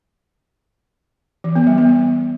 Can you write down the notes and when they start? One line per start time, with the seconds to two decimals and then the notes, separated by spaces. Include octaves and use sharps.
1.44 E3
1.56 B3
1.67 G3
1.78 B3